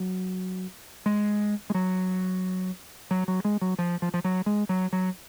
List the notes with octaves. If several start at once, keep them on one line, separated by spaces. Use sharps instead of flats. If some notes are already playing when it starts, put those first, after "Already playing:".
Already playing: F#3
G#3
G#3
F#3
F#3
F#3
G#3
F#3
F3
F3
F3
F#3
G#3
F#3
F#3